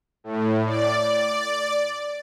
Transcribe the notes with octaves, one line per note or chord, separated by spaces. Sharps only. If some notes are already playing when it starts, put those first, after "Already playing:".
A2
D5